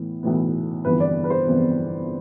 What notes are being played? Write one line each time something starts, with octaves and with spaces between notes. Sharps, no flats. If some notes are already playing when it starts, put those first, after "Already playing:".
Already playing: A2 E3 B3
B1 A2 E3 B3
G1 F2 E3 B3 B4
D5
B4
C5
G1 F2 E3 B3